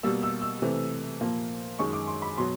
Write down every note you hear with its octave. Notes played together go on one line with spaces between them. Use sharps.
B2 G3 A#3 E6
E6
E6
C3 E3 A3
A#2 F3 A#3
F#2 D#3 G#3 C#6
D6
C6
B5
B2 F#3 C6